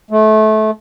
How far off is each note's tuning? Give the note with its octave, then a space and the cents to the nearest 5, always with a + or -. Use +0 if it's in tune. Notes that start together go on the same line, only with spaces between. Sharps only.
A3 -25